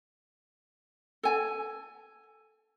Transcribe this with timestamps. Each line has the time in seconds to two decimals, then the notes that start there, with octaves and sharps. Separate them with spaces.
1.23 A4 G#5